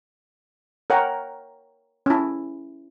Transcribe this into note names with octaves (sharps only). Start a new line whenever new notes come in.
A#4 C#5 F#5 G5 A#5
C#4 E4